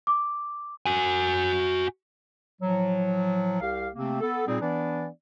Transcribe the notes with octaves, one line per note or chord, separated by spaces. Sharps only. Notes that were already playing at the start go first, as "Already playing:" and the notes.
D6
F#4 G#5
A2 F3 F#3
C2 G4 F5
C3 A3 A#3 C4
B3 A4
A#2 G3 C4 D#4 G#4
E3 B3 D4 D5